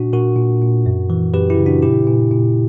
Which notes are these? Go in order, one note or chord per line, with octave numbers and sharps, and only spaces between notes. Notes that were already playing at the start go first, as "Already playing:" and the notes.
Already playing: A#2 D4 F#4
A#2 F#4 A#4
A#2
A#2
F#2
E3
F#2 G4 B4
E4 G4
C#3
D4 F#4
A#2 E4 G4
A#2
A#2